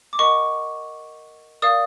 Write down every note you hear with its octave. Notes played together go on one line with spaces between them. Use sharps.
D6
A#4 D#5 F#5 C#6
A#4 D5 F5 D#6